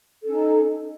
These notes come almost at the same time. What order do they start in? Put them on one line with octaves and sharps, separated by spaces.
A4 C#4 D#4